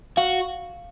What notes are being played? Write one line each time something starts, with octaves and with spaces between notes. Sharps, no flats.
F#4 F5